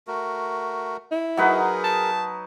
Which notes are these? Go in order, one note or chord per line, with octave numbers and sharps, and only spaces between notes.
A3 F#4 A#4
E4
F#3 D#4 G#4 A#4 B4
A5